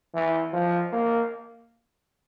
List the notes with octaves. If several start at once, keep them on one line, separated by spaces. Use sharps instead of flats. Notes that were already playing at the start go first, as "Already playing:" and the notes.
E3
F3
A#3